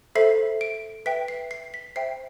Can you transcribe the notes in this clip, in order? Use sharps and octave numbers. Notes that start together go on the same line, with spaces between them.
A4 C5 E5 C7
D7
B4 E5 G5 B6
C7
C7
B6
C5 E5 G5 C7